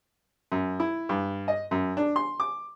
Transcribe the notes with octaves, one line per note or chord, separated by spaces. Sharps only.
F#2
E4
G2
D#5
F#2
D4
C6
D6